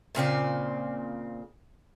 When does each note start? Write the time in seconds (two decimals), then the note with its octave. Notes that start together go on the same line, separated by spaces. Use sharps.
0.15 A#2 C#3 C4 D5